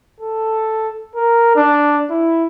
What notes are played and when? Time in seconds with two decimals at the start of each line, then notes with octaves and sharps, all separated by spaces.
0.20 A4
1.16 A#4
1.56 D4
2.10 E4